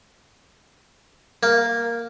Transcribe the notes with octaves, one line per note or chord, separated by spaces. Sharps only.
A#3